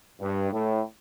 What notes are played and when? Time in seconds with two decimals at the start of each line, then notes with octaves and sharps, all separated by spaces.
0.21 G2
0.53 A2